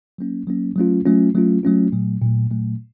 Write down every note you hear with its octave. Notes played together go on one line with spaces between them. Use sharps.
F#3 A#3 C#4
F#3 A#3 C#4
F#3 A3 C#4 F4
F#3 A3 C#4 F4
F#3 A3 C#4 F4
F#3 A3 C#4 F4
A#2 F#3 A3
A#2 F#3 A3
A#2 F#3 A3